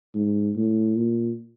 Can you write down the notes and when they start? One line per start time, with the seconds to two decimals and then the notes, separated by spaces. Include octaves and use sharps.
0.15 G#2
0.56 A2
0.96 A#2